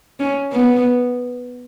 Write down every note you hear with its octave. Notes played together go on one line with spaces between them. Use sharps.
C#4
B3